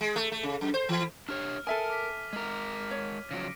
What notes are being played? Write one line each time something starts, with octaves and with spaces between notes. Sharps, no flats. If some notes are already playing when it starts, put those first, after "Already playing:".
G#3
A3
A3
C#3
F#2
C5
E3
D4 G4 C#5 F6
A4 A#4 E5 G#5 D#6 D#7 G7
D6 B6
G#3 A#4
C#5
C#3 F3 F#3 A#6 C#7 D7